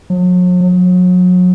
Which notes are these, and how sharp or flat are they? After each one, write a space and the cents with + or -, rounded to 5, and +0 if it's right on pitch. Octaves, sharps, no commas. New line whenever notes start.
F#3 -45
F#3 -35